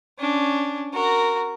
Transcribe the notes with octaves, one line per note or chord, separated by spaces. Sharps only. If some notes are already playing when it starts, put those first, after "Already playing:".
C#4 D4
F#4 A#4